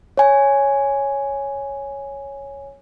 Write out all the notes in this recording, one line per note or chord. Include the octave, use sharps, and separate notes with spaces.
C#5 G#5